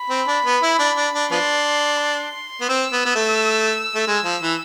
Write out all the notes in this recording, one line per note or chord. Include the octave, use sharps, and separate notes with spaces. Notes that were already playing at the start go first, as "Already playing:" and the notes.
Already playing: B5
C4
D4
B3
E4
D4
D4
D4
F3 B3 D4 C6
C6
B3
C4 E6
B3
B3
A3
A3
G#3
F3
E3